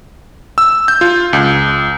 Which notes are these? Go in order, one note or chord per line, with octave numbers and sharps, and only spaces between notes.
E6
G6
F4
C#2